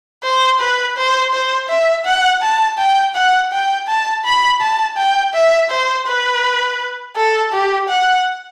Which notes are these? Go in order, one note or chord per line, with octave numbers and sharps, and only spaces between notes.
C5
B4
C5
C5
E5
F#5
A5
G5
F#5
G5
A5
B5
A5
G5
E5
C5
B4
A4
G4
F#5